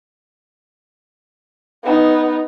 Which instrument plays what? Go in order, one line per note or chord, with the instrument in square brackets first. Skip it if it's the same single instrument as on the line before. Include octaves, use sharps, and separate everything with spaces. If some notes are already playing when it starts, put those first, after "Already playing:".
[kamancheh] B3 D#4